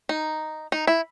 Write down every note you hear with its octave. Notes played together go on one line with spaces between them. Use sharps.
D#4
D#4
E4